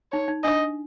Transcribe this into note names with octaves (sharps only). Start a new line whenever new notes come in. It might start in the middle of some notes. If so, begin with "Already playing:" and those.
D#4 C#5
D#4
D4 D#5